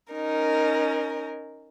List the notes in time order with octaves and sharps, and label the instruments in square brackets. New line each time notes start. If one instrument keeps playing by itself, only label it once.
[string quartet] C#4 D#4 A#4